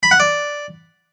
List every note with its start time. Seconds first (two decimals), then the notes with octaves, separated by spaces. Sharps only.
0.03 B5
0.11 F#5
0.20 D5